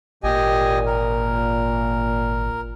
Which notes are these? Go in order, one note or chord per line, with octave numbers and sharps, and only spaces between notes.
G#1 A#2 G4 D#5 G#5
A#4